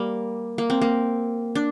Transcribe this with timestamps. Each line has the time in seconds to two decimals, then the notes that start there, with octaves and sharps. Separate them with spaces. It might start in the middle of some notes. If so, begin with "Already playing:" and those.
Already playing: G3 A#3
0.58 A#3
0.70 C4
0.81 A#3
1.55 D4